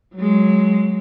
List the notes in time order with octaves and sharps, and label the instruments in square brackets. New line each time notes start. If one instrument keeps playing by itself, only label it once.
[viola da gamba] F#3 G#3